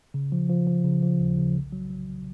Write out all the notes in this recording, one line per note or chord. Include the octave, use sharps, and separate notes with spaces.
C#3
F3
F3
F3
C#3
F3
D#2
C#3
B1
F#3
F#3